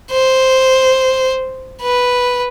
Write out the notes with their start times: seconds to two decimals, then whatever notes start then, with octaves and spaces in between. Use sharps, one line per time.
0.12 C5
1.82 B4